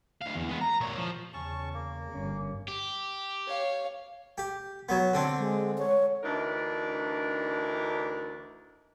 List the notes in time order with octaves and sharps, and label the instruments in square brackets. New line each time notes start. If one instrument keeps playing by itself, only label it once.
[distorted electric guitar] D2 F5
E2
G#3 B3
A#5
A#2 C#5
F3
[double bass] E2 C#3 [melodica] C#4 A5 C#6
[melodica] A#3
[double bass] G1 C#4
[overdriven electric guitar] G4
[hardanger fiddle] C#5 F5
[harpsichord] G4
F#3 B3
D3 C4 D4
[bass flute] G#3
C#5
[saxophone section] D2 E3 D4 D#4 A#4